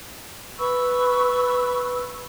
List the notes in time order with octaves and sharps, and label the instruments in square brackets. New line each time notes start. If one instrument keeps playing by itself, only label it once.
[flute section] B4 B5 C#6 E6